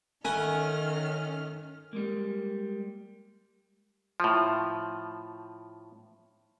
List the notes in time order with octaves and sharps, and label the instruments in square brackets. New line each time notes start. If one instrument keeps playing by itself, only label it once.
[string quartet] D#3 F6 [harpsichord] A3 F#5 [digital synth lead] C#4 [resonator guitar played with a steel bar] G#5
[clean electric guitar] G3 G#3 A#3
[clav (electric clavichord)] A2 F3